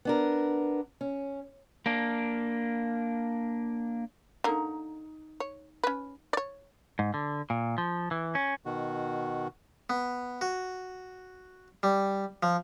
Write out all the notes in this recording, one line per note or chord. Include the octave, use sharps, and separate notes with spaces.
B3 D4 A#4
C#4
A#3 D4
D3 A#3 D#4 A#5
C#5
C#4 B4
C#5 D5
G#2
D3
A#2
F3
E3
C#4
B2 D#3 F#4
B3
F#4
G3
F3